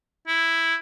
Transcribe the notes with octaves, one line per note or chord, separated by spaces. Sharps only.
E4